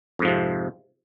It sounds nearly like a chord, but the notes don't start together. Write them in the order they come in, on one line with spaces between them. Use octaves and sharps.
F2 G#2 F3 C3